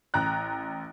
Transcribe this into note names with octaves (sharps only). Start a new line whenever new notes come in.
A1 A#5 F#6